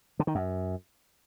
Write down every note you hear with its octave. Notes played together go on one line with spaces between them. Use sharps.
D3
D#3
F#2